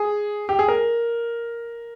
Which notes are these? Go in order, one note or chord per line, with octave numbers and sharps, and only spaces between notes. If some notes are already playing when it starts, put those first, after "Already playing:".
Already playing: G#4
G4
G#4
A#4